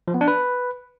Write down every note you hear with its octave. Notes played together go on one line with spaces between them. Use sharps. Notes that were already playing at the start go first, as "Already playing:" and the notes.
F3
B3
D4
B4